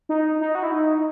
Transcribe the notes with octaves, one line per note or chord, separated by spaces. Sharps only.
D#4
D#4
F#4
E4
D#4